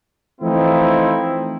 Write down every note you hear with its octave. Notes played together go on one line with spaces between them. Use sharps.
E3 F3 A3 C4 D#4 E4